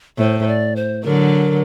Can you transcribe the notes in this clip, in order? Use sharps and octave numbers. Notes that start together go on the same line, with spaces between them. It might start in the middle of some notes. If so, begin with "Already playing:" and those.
A2 C5
C5
D5
C5
D3 F#3 A#4